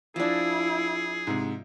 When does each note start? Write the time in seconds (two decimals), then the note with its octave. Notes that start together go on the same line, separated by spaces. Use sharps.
0.16 F3 D4 E4 G#4
1.27 G#2 C3